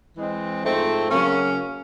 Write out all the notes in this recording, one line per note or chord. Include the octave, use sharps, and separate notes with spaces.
E3 G#3 C4
G#2 F3 A3 C4
C#3 F#3 A#3 C#4